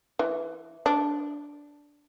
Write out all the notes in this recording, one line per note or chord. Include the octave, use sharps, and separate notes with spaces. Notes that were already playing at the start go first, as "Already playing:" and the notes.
E3
D4